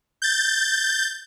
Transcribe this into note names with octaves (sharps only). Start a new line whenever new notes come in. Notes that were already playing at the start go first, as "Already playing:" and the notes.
G6 A6